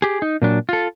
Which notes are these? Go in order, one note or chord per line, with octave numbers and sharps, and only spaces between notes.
G4 G#4
D#4
A#2 F#3 D4
F4 A4